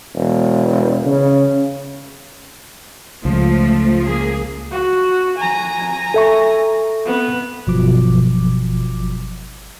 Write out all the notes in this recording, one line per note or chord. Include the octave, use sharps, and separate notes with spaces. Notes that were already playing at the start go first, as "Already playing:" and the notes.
E1
C#3
C#2 F3 A3
A#3 G#4
F#4
G#5 A#5
A4 E5 C#6
B3
G1 B2 F3 F#3 D6